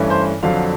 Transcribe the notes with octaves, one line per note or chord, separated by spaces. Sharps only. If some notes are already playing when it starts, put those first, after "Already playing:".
Already playing: G2 E3 A3 C#4
C5
F2 D3 F#3 F5